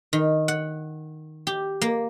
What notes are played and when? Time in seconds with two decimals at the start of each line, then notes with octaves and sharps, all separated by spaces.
0.13 D#3
0.48 F#5
1.47 G4
1.82 A#3